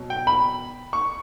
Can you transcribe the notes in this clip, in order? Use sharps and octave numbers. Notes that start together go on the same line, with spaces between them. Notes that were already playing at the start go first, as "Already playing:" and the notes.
Already playing: B2 F#3
G5
B5
C#6